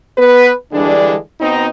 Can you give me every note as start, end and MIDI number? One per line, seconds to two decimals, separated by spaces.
0.17 0.52 59
0.17 0.52 71
0.73 1.15 50
0.73 1.15 52
0.73 1.15 55
0.73 1.15 56
0.73 1.15 62
1.40 1.67 47
1.40 1.67 59
1.40 1.67 60
1.40 1.67 63